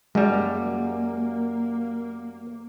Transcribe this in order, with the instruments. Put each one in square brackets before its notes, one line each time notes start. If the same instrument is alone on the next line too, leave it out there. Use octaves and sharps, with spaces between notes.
[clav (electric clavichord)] F#2 G3 [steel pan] G#3 [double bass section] A#3